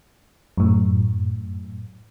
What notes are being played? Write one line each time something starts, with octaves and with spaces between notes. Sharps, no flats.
F#2 A2